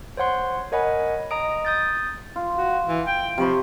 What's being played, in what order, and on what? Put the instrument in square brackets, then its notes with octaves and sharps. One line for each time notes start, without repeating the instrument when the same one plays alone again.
[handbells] C5 C#5 F#5 C6
A#4 C#5 D#5 F#5 G#5 B5
D#5 A#5 D#6 D7
D#6 G6 A6
[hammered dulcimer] F4
[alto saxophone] F#4
E3
G5
[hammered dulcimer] C3 C#5 B5 [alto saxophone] F3